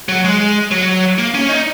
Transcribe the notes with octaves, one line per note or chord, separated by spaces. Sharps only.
F#3
G#3
F#3
A#3
C#4
D#4